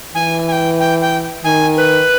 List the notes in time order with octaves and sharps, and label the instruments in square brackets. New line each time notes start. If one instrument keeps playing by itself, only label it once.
[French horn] E3 [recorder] G#5
[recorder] G#5
G5
G5
G5
[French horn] D#3 [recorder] G#5
[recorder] B4